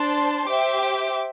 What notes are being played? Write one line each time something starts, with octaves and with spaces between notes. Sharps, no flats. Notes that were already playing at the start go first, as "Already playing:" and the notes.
Already playing: D4 C5 A5 C6
G4 C5 E5 G5 D6